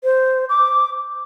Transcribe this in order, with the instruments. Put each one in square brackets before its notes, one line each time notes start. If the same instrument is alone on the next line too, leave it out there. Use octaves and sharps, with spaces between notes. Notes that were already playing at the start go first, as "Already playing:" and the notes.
[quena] C5
D6